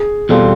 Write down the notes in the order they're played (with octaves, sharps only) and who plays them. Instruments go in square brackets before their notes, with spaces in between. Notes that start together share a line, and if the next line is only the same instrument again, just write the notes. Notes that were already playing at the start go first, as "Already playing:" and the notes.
Already playing: [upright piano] G#4
[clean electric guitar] E2 B2 G3 C4 F4 [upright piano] A4